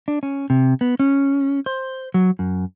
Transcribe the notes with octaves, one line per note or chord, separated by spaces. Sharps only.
D4
C#4
C3
B3
C#4
C5
F#3
F#2